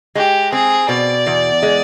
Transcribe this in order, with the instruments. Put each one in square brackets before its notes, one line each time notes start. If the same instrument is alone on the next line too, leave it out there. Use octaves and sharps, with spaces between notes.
[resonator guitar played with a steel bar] G#3 [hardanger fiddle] G4
[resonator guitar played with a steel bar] C4 [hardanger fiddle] G#4
[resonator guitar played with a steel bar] B2 [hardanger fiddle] D5
[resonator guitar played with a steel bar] E2
G#3